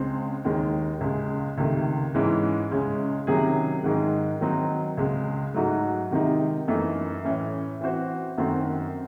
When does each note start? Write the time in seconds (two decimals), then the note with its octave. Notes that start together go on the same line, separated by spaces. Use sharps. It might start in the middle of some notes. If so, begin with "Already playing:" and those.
Already playing: C#2 C#3 G#3 C4
0.44 D#2 D#3 G#3
1.01 C#2 C#3 G#3
1.58 C#2 C3 D#3 A3
2.14 G#2 E3 G#3 C#4 E4
2.71 C#2 C#3 G#3 C#4
3.27 C3 D#3 F#3 C#4 G#4
3.84 G#2 D#3 G#3 D#4
4.41 D#3 F#3 C4 D#4
4.98 C#2 C#3 G#3
5.54 G#2 F#3 A3 D#4 F#4
6.11 C3 D#3 G#3 D#4
6.68 F#2 E3 A3 D#4
7.24 A2 E3 A3 C#4
7.81 E3 C4 F#4 C5
8.37 F#2 D#3 A3 C4 F#4